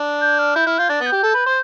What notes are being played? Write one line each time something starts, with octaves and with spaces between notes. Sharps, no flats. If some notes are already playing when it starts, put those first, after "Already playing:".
Already playing: D4
G6
F6
E4 G6
E4 F6
F4 G6
D4 A6
B3
G6
G4
A4
B4
C5